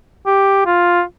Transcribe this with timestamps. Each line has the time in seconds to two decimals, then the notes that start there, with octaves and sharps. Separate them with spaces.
0.26 G4
0.66 F4